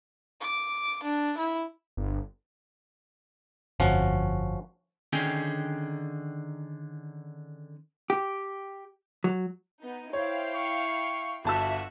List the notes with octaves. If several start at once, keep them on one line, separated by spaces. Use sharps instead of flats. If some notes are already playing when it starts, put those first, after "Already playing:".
D6
D4
E4
G1
G1 F2 F3 C#4 F#4
D3 D#3 C#4 G#4 G5
G4
F#3
B3 D#4
E4 C5 C#5 F5 G5
C#6
G1 F4 F#4 E5 A5 E6